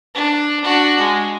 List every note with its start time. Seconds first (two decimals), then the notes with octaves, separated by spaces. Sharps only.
0.15 D4
0.64 D4 F#4
1.00 G#3